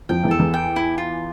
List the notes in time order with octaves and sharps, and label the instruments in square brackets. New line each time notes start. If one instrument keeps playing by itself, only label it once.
[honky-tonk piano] F2 F3 [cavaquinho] G5
[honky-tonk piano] E2 E3
[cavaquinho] A4
[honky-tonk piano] E2 E3
[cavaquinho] G5
E4
F4